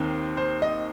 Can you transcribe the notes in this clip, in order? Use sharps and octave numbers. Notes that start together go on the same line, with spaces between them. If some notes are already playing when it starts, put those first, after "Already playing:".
Already playing: D#2 D#3 C4
C5
D#5